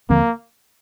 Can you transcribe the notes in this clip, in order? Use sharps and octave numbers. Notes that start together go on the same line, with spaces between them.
D#2 D3 F3 A#3 C4